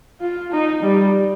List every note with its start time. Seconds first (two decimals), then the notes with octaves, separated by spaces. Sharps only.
0.21 F4
0.51 D#4
0.82 G3